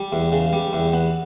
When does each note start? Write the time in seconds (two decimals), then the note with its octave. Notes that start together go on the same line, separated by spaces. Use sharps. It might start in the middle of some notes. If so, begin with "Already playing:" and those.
Already playing: G3
0.12 E2
0.32 C#3
0.53 G3
0.73 E2
0.93 B3